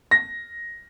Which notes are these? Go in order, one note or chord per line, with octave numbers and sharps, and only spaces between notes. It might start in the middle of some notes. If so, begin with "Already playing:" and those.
A#6